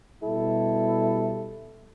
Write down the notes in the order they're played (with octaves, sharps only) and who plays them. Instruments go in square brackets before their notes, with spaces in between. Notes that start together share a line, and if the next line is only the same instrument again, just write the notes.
[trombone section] B2 G3 E4 A4